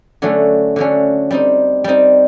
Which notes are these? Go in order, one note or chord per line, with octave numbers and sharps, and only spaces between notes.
D3 F#3 A3 C#4
D3 F#3 A3 C#4
G3 C4 D#4
G3 C4 D#4